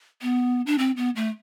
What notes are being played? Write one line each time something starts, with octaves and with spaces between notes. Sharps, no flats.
B3
D4
C4
B3
A3